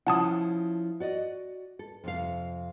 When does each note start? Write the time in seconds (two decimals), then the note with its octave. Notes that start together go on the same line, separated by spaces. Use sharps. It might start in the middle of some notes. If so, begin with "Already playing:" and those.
0.07 F3 C#4 E4 F#5 A5 D#6
1.00 F#4 D5 D#5
1.79 A4
2.04 F2 C3 F5